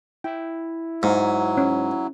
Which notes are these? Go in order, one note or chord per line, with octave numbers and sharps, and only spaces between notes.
E4 G5
G#2 F#3 F5
C#4